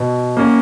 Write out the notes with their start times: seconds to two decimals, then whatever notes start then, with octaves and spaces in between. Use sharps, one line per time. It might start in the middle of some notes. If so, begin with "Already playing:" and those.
Already playing: B2
0.37 A#3 C#4